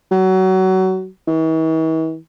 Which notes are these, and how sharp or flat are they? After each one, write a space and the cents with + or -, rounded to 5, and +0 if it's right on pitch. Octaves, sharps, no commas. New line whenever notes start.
F#3 +25
E3 -45